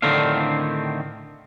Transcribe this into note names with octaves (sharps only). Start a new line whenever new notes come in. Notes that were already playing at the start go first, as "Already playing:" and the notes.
A2 D3 D#3 C4 D4 F5